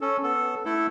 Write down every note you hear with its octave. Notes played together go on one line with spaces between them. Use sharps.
C#4 A4
B3 A4
A3 E4 A4